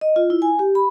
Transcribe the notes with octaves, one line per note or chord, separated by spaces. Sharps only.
D#5
F4
E4
G#5
G4
B5